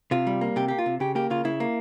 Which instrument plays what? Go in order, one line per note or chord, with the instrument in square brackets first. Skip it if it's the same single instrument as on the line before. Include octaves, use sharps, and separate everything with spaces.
[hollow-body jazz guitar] C3 F4
G3
A#3
C3 G4
A#3 G4
F4
C3
C#3 G4
A#3 G4
C#3 F4
C#3 E4
A#3